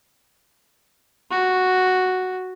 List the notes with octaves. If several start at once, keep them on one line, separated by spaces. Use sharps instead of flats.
F#4